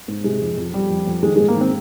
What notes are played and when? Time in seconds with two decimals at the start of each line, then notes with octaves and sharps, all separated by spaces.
0.08 G#2
0.24 C3 G#3
0.41 F2
0.57 F2
0.74 F2 G3
0.90 F2
1.07 F2
1.23 D#3 G#3
1.36 G#3
1.40 G#2
1.48 A#3
1.57 D#3 C4